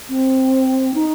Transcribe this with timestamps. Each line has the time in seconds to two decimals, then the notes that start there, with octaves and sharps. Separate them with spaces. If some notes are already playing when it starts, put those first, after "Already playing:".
0.09 C4
0.94 D#4